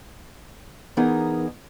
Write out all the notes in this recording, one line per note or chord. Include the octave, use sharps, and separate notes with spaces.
E3 B3 D#4 G#4 A#4 D#5